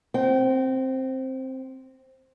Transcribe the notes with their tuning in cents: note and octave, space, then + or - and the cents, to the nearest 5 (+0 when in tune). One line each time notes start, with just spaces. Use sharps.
C4 +5 G5 -35